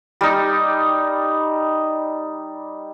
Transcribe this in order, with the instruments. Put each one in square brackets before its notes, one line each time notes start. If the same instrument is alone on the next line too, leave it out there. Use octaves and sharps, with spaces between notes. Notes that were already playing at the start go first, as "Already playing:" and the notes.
[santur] G3 D#4